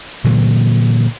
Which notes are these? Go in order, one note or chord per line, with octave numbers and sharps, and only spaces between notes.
A#2 D3 E3 F#3